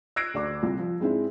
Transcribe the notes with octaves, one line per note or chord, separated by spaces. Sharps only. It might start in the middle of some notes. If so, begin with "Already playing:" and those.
E6 F#6 G#6 A#6 C7 D7
D2 D5 D6
C2
F3
G#2 G#3 C4 D4 E4